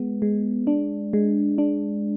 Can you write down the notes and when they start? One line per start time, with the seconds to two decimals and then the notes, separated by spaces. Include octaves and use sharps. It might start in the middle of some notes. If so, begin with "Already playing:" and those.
Already playing: G#3 B3
0.22 G#3
0.67 D4
1.13 G#3
1.58 D4